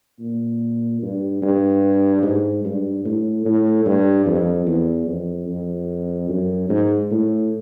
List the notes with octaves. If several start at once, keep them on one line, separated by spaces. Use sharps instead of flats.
A#2
G2
G2
G#2
G2
A2
A2
G2
F2
E2
F2
F2
F#2
G#2
A2